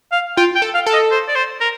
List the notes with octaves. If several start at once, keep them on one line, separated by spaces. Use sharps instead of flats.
F5
F4 G5
G5
A4
F5
A4
D#5
C5
D5
C5
A#4